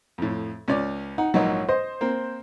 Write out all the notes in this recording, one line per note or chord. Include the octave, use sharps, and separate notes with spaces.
F2 A2
C#2 C#4 D5
D#4 F#5
A#1 G#2 F#3 C#5 D#5 F#5
C5 D#5
A#3 C4